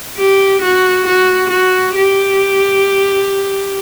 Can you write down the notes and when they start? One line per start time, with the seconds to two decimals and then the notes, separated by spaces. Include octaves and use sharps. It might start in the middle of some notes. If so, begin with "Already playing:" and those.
0.17 G4
0.62 F#4
1.06 F#4
1.50 F#4
1.95 G4